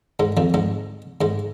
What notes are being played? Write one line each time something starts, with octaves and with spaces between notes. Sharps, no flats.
G#2 G#3
F2 F3
G#2 G#3
G#2 G#3